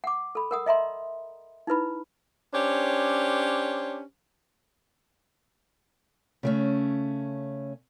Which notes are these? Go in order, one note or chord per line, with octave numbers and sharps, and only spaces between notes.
F#5 D6
A4 B5
A#4 F#5 D#6
D#5 E5 A#5 C6
D#4 E4 B4 B5
C#4 D4 G4 C5 C#5
C#3 A3 C#4